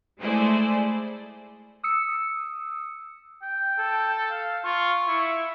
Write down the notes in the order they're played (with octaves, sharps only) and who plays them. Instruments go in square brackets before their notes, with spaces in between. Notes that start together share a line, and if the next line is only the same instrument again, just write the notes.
[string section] G#3 A3 E4 G#4 C5 D5
[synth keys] D#6 E6 C#7
[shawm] G5
[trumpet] A4
[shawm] F5
[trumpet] F4 [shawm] C#6
[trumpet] E4